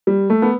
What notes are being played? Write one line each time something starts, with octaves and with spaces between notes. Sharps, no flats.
G3
A3
B3